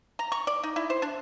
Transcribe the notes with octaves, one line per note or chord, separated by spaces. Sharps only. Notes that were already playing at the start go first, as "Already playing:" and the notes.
A#5
C#6
D5
D#4
E4
C5
D4